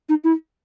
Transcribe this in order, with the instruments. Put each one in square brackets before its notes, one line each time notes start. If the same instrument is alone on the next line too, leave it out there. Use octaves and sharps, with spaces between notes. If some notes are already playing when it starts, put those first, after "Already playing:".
[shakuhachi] D#4
E4